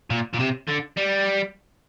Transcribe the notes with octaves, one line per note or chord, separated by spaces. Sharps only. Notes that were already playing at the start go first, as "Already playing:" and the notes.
A#2
A#2
C3
D3
G3